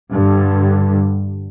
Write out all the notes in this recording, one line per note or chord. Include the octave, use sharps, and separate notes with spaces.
G2 D3